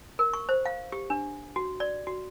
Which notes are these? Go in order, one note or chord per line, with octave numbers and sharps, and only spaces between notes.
A#4
C#6
C5
F5
G4
D4
F#4
D5
F#4